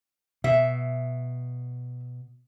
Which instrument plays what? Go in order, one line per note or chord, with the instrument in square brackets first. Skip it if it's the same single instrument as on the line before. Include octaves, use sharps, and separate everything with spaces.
[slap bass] B2 [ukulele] E5